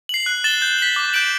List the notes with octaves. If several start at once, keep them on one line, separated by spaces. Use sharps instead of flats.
C7 F#7
F#6
A6 E7 G7
G6
B6 F#7
D6
G6 D7 F#7